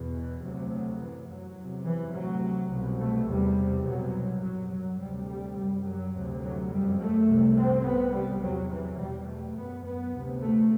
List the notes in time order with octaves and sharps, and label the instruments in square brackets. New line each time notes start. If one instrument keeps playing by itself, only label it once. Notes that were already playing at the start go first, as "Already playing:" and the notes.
Already playing: [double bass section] E2 B2
E3
D2 C3 F#3
F#3
F#2 E3
F#3
E2 C3
E3
D2 C3 F#3
C2 B2
A3
E2 C3 G3
C2 B2 F#3
F#2 F#3
F#3
D2 C3 G3
G3
F#2 G3
F#3
D2 C3
F#3
F#2 G3
A3
C2 C3
C4
C2 C3 B3
G3
E2 C3 F#3
E3
E2 B2 G3
A3
F#2 B3
B3
D2 C3
A3